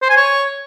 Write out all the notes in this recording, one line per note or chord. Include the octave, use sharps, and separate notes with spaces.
C5
G#5
C#5